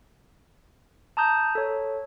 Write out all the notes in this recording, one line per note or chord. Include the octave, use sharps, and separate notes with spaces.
A5 A#5 D#6 G6
A4 C#5